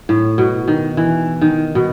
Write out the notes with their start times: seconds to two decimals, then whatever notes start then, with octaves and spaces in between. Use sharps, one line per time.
0.09 A2
0.38 B2
0.68 D#3
0.97 E3
1.41 D#3
1.75 B2